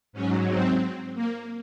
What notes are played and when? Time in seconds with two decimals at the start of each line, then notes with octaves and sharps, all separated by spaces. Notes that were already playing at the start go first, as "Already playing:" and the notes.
0.13 G#2 F#3 C#4
0.47 C4
1.15 A#3